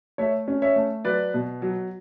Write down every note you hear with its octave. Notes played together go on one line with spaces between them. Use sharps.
A3 C#5 E5
C#4
C#5 E5
A3
F#3 B4 D5
B2
F#3